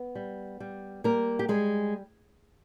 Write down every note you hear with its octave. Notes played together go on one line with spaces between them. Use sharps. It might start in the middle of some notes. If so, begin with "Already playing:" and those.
Already playing: B3
G3
G3
G3 A#3 A#4
G4
G3 G#3 G#4